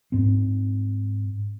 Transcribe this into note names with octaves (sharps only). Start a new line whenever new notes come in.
G#2 C4